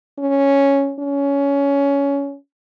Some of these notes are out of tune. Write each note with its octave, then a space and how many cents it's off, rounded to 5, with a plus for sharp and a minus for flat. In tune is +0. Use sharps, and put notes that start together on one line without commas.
C#4 +0
C#4 +20